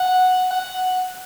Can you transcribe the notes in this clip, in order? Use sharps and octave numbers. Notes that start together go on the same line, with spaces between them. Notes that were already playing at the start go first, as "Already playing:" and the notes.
Already playing: F#5
F#5